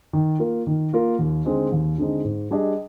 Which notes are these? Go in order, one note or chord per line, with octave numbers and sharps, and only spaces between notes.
D#3
A#3 F4 A#4
D#3
A#3 F4 A#4
D#2
D3 G#3 C4 D#4
D#2
D3 G#3 C4 D#4
G#2
G3 D4 G#4 D#5